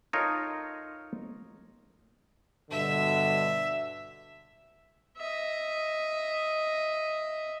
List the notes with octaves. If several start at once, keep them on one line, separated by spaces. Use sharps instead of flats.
D#4 F4 A4 A#4 C#5 D#5
G2 B2 D3 E5
D#5 E5